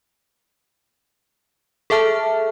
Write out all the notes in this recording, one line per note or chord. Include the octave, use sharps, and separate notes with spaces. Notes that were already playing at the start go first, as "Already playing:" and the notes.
G#4 A4 E5 A5 F6